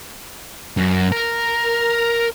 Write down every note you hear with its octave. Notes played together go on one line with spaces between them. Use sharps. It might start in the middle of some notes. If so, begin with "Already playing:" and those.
F#2
A#4